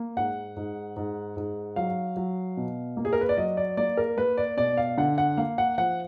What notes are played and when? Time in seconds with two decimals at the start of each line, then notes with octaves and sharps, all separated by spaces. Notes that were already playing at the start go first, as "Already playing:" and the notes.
Already playing: A#3
0.16 G#2 F#5
0.57 G#2
0.96 G#2
1.37 G#2
1.76 F#3 F5
2.17 F#3
2.57 B2
2.97 A#3
3.05 G#4
3.13 A#4
3.21 B4
3.29 D5
3.37 F#3 D#5
3.57 D5
3.77 A#3 D5
3.97 A#4
4.17 A#3 B4
4.37 D5
4.57 B2 D5
4.77 F5
4.97 D3 F#5
5.18 F#5
5.37 A#3 F5
5.58 F#5
5.78 F3 F#5